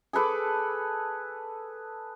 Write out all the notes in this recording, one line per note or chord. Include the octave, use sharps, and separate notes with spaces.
G#4 A4 B4 D6